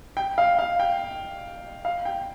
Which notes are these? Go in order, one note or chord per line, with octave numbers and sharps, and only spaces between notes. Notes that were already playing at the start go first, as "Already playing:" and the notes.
G5
F5
F5
G5
F5
G5